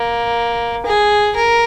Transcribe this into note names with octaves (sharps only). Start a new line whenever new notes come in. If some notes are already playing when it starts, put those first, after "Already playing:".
Already playing: A#3
G#4
A#4